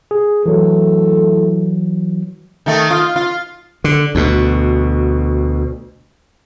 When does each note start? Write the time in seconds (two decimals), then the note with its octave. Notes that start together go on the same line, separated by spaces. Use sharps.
0.11 G#4
0.46 E3 F#3 A3 E4 A4
2.66 D#3 A3
2.90 F4
3.16 F4
3.84 D3
4.15 D2 B2